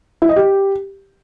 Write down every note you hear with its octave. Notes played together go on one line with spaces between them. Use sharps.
E4
D#5
G4